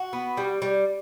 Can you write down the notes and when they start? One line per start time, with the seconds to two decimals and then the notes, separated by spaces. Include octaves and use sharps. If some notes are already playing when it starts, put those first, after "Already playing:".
Already playing: F#4
0.13 B3
0.37 G3
0.62 G3